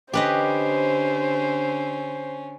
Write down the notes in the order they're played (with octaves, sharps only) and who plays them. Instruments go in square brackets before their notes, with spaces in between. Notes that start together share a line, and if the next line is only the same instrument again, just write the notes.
[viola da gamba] D3 [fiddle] C#4 [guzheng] G4 B4 D#5 [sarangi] C5